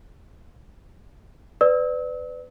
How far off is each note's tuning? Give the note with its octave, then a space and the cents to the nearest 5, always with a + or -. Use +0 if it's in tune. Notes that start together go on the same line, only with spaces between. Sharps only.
B4 +30 D5 +5 E6 -40